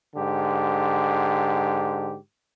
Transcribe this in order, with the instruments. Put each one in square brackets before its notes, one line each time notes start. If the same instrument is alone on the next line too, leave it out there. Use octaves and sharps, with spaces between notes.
[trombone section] G#2 D3 G4